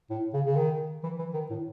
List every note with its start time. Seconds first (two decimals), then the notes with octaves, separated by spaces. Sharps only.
0.10 A2
0.34 C#3
0.46 C#3
0.56 D#3
1.03 E3
1.19 E3
1.34 D#3
1.50 A2